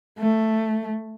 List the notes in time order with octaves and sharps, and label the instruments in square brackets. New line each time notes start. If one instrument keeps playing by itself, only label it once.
[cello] A3